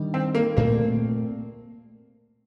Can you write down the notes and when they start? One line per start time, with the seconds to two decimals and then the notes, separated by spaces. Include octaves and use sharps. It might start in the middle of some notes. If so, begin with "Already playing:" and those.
Already playing: D#3 G3 D4
0.14 C4
0.35 A#3
0.57 A#2 A3 A#3 C4